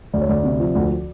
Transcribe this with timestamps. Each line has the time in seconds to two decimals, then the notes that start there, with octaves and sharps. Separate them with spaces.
0.13 D2 D5
0.21 C#5
0.29 D2 D5
0.43 C3
0.60 F3
0.75 D2